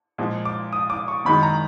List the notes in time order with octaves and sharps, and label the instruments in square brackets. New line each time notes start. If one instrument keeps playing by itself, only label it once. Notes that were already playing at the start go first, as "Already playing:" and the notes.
[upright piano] A#2 F3 G#3
D6
D#6
D6
C#6
F#2 D#3 G#3 B5
A#5